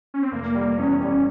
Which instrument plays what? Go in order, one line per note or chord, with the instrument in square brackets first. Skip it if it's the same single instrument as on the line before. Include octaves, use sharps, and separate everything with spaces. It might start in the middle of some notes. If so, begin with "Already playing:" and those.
[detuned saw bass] C#4
C4
[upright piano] F1 [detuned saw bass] A#3
[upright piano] G3
[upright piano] E2 [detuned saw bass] C#4
[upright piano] G3